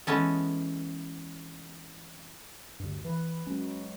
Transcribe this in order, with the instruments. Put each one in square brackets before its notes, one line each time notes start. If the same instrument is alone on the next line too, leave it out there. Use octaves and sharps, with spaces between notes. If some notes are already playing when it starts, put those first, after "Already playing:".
[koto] E3 G#3 B3 C#4 A4
[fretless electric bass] D2 G2
[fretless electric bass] E3 [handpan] B4
[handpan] F#3 G#3 [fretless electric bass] C#4